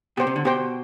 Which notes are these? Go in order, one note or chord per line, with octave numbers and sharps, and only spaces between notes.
B2 G4 C5 G5
C3
D3
B2 G4 C5 G5